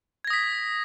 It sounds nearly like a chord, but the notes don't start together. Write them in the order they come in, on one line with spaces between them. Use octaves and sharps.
G#6 A#6 D#6 B6